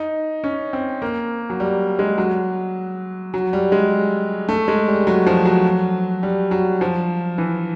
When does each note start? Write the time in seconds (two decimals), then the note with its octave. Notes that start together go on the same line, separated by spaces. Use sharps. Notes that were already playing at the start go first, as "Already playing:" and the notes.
Already playing: D#4
0.44 C#4
0.73 C4
1.02 A#3
1.50 F#3
1.60 G3
1.99 G#3
2.18 F#3
3.34 F#3
3.53 G3
3.72 G#3
4.49 A3
4.68 G#3
4.88 G3
5.07 F#3
5.27 F3
5.45 F#3
6.23 G3
6.51 F#3
6.81 F3
7.38 E3